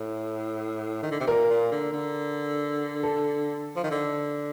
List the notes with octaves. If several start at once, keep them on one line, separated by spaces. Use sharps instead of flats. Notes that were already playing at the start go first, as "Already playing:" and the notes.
Already playing: A2
D#3
D3
C3
A#2 A#4
A#2
D3
D3
A4
F3
D#3
D3